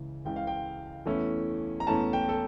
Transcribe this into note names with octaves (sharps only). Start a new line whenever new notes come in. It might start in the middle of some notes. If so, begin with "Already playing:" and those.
Already playing: C#2 C#3 E3
C#2 C#3 E3 G5
F5
G5
E2 E3 A3 C#4 E4
A#5
E2 E3 A3 C#4 E4 A5
G5
A4